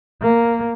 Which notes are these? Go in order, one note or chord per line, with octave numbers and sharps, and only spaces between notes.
A#3